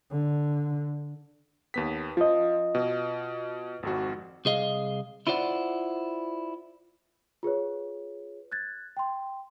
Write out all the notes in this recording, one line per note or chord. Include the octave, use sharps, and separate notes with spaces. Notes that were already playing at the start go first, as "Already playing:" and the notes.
D3
D#2 B3 B6
F3 F4 D#5
B2
G#1 F2 F#4
C2 G#4 D#5 F5
E4 F4 C5 D5 F#5
F4 G#4 B4 C#5
F#6 G#6 A6
G5 C6